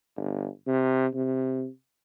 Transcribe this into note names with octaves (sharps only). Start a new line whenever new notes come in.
G1
C3
C3